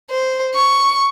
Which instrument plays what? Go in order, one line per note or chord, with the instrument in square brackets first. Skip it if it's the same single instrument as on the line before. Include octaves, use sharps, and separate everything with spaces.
[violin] C5
C#6